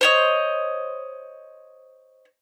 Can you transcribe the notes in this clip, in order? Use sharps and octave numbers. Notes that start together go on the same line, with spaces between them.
C5 C#5 D#5